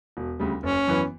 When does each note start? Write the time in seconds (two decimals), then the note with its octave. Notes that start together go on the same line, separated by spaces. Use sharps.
0.17 E1
0.39 D2 C#3 G3
0.63 F#1 C#4
0.87 F#2 E3 B3